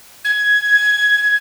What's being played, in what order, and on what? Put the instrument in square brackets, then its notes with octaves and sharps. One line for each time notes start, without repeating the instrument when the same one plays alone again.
[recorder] G#6